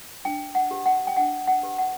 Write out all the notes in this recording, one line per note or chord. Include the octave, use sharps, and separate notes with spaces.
D4 G5
F#5
G4 B4
F#5
G5
D4 F#5
F#5
G4 B4
F#5